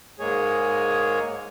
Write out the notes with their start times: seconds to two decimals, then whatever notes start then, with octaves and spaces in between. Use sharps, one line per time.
0.19 G#2 G#3 A#3 G#4 C#5